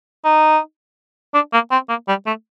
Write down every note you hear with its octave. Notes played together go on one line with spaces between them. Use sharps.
D#4
D4
A#3
C4
A#3
G3
A3